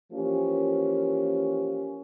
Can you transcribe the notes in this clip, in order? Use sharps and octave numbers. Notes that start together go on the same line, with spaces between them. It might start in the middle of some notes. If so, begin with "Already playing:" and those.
E3 F3 A#3 C#4 G4